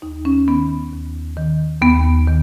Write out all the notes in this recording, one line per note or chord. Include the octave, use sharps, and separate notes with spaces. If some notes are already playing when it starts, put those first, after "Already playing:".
D#2 D#4
C#4
D#3 B3
D#2
D#3
D#2 B3
D#3